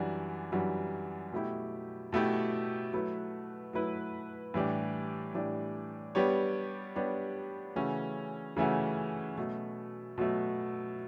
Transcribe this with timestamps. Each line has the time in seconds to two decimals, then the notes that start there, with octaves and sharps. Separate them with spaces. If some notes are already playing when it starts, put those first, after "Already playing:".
Already playing: F#2 E3 G3 D4 F#4
0.52 F#2 E3 G3 D4 F#4
1.32 B2 A3 E4 G4
2.13 B2 A3 E4 G4
2.93 F#3 A3 E4 B4
3.73 F#3 A3 E4 B4
4.54 A2 E3 G3 D4 G4
5.34 A2 E3 G3 D4 G4
6.15 G3 B3 D4 G4 C#5
6.96 G3 B3 D4 G4 C#5
7.76 C#3 E3 A3 C#4 F#4
8.57 C#3 E3 A3 C#4 F#4
9.37 B2 F#3 A3
10.18 B2 F#3 A3